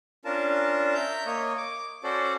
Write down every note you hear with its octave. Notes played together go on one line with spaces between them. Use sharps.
C#4 D4 F4 A#4 A5
E5 A#5 G6
A#3 C#5 D#5
D6
C#4 F#4 A4 C5 D5